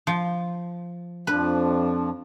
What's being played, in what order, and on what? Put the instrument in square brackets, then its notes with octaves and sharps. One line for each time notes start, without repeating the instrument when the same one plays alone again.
[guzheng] F3
[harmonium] F2 F3 [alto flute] D4 [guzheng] B4